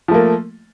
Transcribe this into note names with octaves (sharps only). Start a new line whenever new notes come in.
F3 A3 A#3